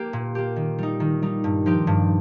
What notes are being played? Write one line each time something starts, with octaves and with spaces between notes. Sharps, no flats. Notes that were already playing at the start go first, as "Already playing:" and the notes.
Already playing: A#3 G4
A#2
A#3 G4
D#3
G3 D#4
D#3
G3 D#4
G2
F3 D#4 G4
G2